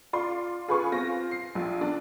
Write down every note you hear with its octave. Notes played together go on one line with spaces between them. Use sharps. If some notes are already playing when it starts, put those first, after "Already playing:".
F4 D5 C6
F4 G#4 B4 G#5 C#6
C4 F4 A#6
C7
A#1 F4
D4